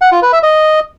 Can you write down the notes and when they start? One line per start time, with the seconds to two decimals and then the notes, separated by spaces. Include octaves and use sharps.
0.01 F#5
0.12 F4
0.22 B4
0.33 E5
0.43 D#5